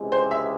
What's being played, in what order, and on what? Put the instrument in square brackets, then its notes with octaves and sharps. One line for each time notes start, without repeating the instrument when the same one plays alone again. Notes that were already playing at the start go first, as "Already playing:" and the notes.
Already playing: [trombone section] C#2 C3 E3 G#3
[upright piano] C5
E5